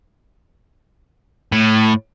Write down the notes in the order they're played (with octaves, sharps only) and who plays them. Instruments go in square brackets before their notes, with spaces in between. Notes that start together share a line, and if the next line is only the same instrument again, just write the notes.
[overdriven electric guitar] A2